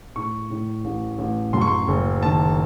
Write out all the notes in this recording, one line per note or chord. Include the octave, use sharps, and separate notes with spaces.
A2 C#6
A2
A1
A1
F#2 C6
C#6
C6
F#1
D#3 A5